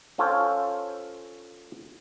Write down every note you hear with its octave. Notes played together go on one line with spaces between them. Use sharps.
C#4 F4 A4 C5 C#5